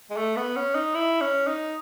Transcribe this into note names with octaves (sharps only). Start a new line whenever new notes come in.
G#3
A3
B3
C#4
D#4
E4
C#4
D#4